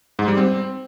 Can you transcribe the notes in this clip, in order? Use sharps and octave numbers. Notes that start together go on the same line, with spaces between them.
G#2
G3
C4